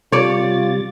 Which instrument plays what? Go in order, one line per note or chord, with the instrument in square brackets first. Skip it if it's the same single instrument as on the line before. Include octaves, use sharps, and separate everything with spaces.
[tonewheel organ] C3 G3 A6 [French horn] F4 [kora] C#5 D5